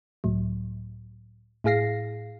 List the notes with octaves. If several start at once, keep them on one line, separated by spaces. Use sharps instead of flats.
C#2 A2 F#3
A2 E4 G#4 F5 A#6 C7